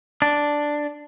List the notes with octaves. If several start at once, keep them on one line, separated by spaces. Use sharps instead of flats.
D4